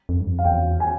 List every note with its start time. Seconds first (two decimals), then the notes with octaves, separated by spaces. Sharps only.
0.09 F2
0.20 G2
0.26 F2
0.39 F5
0.44 E2 G5
0.80 G#5